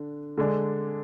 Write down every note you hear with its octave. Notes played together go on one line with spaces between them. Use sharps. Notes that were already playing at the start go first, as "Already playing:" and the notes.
Already playing: D3 D4
D3 G#3 D4